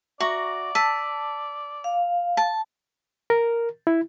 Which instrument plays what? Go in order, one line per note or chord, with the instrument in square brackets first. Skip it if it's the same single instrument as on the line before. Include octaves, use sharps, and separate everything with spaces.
[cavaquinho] F#4 A#5 [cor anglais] D5 [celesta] E5 C#6
[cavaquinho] A5 [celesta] E6 B6 D#7
[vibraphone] F5
[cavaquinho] A5
[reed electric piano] A#4
E4